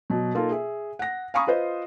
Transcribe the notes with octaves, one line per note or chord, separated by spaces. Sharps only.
B2 F#3
A#3 D#4 F4 A4
G#4 E5
F#5 A#6
F5 G#5 A#5 B5 C#6 D#6
F4 B4 C5 D#5